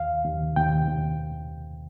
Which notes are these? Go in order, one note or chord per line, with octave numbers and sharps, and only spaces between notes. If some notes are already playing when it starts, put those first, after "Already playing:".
Already playing: D#2 F5
D#2
D#2 G5
D#2